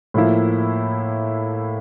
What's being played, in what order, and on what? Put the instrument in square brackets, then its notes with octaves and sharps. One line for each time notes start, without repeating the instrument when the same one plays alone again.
[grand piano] A2 F3 A#3 E4